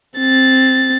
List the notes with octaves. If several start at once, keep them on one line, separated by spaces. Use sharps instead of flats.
C4 A6